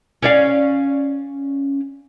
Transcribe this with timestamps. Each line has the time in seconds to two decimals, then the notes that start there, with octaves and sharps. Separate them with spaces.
0.22 C#4 D5 F5